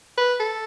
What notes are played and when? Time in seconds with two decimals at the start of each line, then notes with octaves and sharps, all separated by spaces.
0.18 B4
0.40 A4